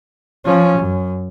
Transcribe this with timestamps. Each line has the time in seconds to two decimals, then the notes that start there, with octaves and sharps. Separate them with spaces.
0.45 F3 C#4
0.78 F#2